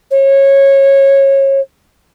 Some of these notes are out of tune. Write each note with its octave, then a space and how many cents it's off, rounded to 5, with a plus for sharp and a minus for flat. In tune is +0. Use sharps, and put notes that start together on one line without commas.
C#5 -20